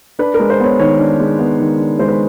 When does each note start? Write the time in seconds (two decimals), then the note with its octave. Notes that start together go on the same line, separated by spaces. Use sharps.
0.19 D4 B4
0.34 A#4
0.40 G#3
0.50 C5
0.60 B3 C#5
0.79 D#3 C#5
0.99 D4
1.19 G#3
1.39 B3
1.60 D#3
1.80 D4
1.99 G#3 C5
2.08 B4